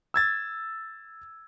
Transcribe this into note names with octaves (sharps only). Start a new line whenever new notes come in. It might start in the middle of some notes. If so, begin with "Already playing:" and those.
E6 G#6 A6